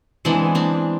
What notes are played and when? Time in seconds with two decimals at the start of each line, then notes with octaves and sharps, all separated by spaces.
0.25 E3 G#3 B3 C4 D4
0.55 C4 D4